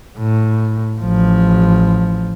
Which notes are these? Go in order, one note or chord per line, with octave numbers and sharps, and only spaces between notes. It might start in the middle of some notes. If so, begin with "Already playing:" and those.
A2
A1 F3